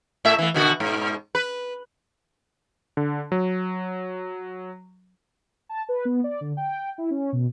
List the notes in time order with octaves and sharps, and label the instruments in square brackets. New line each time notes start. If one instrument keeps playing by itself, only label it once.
[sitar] A2 A3 E5
E3 A3
B2 D3 F#4
G#2 B2
B4
[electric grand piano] D3
F#3
[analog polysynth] A5
B4
B3
D5
D3
G5
E4
C#4
B2